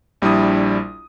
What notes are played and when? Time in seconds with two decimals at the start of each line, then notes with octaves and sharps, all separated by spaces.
0.22 A#1 G3 D4 E4 D#6